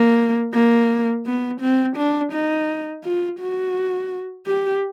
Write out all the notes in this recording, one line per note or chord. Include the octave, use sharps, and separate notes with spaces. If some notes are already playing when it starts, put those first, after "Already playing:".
Already playing: A#3
A#3
B3
C4
D4
D#4
F4
F#4
G4